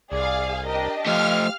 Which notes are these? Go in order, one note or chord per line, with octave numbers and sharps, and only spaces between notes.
C2 G#4 D5 F5
D4 G4 A#4 D#5
F3 A3 G4 D#5 F5 F6